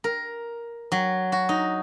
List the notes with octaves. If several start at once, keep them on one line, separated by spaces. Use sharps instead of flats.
A#4
F#3
F#4
D#4